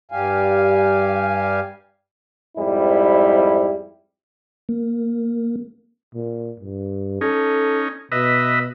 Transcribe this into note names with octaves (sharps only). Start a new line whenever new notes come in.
G2 G3 G4 F5 G#5
F2 G#2 G3 E4
A#3
A#2
G2
C#4 D#4 A4
B2 B4 D#5 E5